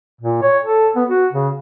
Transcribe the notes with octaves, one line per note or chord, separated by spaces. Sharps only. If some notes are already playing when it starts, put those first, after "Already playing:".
A#2
C#5
A4
B3
F#4
C#3